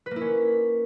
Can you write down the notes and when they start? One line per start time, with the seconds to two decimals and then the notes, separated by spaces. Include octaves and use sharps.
0.06 B4
0.11 A#3
0.16 E4
0.21 C#4